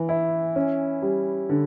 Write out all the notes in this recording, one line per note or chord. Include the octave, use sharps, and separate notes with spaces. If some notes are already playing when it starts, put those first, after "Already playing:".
Already playing: E3
E4
C#4
G3
D3